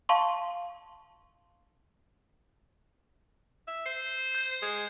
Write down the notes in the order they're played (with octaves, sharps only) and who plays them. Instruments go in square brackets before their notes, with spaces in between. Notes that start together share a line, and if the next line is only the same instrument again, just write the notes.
[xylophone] F5 A5 C6 C#6
[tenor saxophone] E5
[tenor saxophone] C5 [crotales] C7
[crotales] G6 C7
[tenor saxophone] G#3